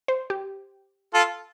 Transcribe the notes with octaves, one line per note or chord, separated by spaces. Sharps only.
C5
G4
F4 A4